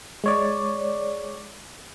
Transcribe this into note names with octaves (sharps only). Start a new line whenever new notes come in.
G#3 C#5 D5